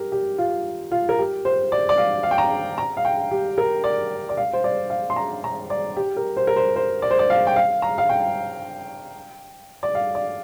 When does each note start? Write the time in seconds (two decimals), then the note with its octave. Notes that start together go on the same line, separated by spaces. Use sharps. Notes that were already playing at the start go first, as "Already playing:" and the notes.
Already playing: G4 A#4
0.12 G4
0.38 F4
0.92 F4
1.09 A#4
1.19 G4
1.45 C5
1.72 D5
1.89 D5
1.98 F5
2.23 F5
2.31 G5
2.38 A#5
2.78 A#5
2.97 F5
3.05 G5
3.31 G4
3.58 A#4
3.84 D5
4.29 D5
4.37 F5
4.53 C5
4.64 D5
4.90 F5
5.10 C6
5.16 A#5
5.44 A#5
5.70 D5
5.97 G4
6.17 A#4
6.37 C5
6.47 A#4
6.56 C5
6.76 C5
7.02 D5
7.11 C5
7.19 D5
7.30 F5
7.47 G5
7.56 F5
7.82 A#5
7.98 F5
8.09 G5
9.83 D5
9.95 F5
10.15 D5